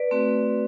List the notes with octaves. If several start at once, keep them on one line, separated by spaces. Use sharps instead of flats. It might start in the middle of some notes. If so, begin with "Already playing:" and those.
Already playing: B4 D5
A3 C4 F#4